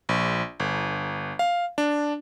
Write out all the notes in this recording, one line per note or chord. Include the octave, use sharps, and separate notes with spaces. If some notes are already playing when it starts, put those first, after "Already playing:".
A#1
G1
F5
D4